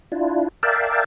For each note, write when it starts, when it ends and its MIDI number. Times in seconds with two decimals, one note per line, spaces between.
0.12 0.48 62
0.12 0.48 64
0.12 0.48 65
0.63 1.04 70
0.63 1.04 74
0.63 1.04 76
0.63 1.04 77
0.63 1.04 79
0.63 1.04 81